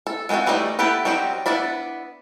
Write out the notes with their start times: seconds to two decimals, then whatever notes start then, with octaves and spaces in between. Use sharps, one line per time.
0.07 A4
0.29 G#3 B3 C4 F4 F#4
0.46 E3 G3 A3 D#4 C#5
0.79 B3 E4 G4 A4 B4
1.05 F#3 G3 C4 D#4 G4
1.46 B3 D4 E4 D5 B5